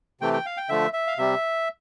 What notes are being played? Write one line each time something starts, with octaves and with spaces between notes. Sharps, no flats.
C3 E3 A3 G5
G5
F5
G5
D3 F3 A3 E5
E5
F5
C3 G3 E5